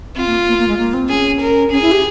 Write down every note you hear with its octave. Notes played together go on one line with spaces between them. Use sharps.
C4 F4
A#3
A#3
A#3
G#3
A#3
C4
C#4 G#4
A#4
C#4 G#4
E4
G4